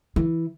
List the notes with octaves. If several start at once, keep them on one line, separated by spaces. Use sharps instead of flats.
E3